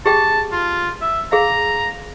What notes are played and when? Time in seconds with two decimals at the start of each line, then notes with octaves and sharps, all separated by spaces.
0.06 G4 G#4 G5 A5
0.52 F4
1.02 E5
1.32 G#4 F5 A#5